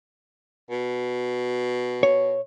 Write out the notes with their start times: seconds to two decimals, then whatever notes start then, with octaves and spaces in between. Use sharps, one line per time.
0.71 B2
2.03 C#5